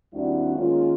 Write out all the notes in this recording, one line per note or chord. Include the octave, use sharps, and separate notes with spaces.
D#2 G3 C4 D4 E4 F#4
D#3 G#3 A#3 C#4 F4